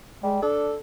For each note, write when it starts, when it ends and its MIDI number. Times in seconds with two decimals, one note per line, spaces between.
0.23 0.42 55
0.23 0.38 56
0.42 0.71 62
0.42 0.77 69